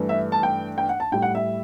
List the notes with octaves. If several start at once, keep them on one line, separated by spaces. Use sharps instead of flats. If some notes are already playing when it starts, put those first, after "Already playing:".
Already playing: G2 E3 A3
E5
A5
G5
G5
F#5
A5
A2 G3 G5
F#5
E5